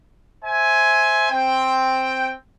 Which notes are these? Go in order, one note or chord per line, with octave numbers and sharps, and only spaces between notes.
C5 E5 G#5
C4 G5